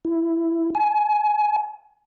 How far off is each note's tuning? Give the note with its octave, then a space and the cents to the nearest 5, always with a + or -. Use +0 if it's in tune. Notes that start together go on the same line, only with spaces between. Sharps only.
E4 +10
G#5 +30